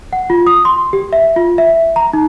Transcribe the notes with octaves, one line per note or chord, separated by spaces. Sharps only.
F#5
F4
D#6
C6
G4
E5
F4
E5
A#5
D#4